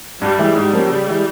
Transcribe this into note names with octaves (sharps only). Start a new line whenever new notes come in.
G2 G3
E3 G#3 E4
G#2 G3
F3 A#3 C#4
C#3
E3 G#3